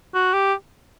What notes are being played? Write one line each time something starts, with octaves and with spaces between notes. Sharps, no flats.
F#4
G4